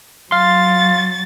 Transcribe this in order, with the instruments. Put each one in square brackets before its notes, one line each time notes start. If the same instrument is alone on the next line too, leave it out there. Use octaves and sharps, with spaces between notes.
[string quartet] F#3 A6 [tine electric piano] F5 C6